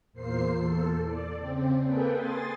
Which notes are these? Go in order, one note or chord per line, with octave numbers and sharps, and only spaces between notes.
E2 A#2 A#3 C5 C7
E2 A4
D5
C#3 C4
A#3 G#4 A4 B4 G5
G#5 C6 D#6 A6